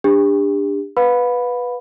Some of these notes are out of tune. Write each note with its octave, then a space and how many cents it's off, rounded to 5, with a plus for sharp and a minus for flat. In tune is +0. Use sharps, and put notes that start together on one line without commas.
D4 +0 G4 +35
B4 +0 F5 +45 B5 +0